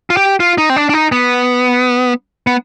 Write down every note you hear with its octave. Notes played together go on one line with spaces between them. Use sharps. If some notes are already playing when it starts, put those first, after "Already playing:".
F4
G4
F4
D#4
C4
D4
D4
D#4
B3
B3